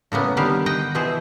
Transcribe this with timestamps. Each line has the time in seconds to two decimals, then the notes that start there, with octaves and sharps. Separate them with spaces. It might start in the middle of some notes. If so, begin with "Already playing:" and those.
0.12 A2 C#3 A#3 B3
0.37 D3 D#3 G3 B3 G4 F5
0.66 D#5 F#5 G5
0.95 B2 E3 E4 G#4 C5